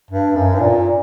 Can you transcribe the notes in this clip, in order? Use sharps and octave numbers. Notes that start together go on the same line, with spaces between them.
G2
F#2
G2
A#2